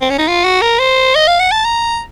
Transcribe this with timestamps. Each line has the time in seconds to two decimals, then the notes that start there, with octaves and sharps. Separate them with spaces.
0.01 C4
0.10 C#4
0.18 D#4
0.28 F4
0.45 F#4
0.61 A#4
0.79 C5
1.15 D#5
1.27 F5
1.40 F#5
1.51 A5
1.65 A#5